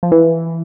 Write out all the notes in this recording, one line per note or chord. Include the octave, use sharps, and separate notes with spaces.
F3
E3